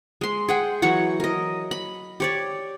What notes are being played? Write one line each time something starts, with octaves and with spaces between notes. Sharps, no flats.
G#3 C6
G#4 F#5 G5
E3 F#3 C#5 F#5
A#4 D#5
B5
G4 C#5 D5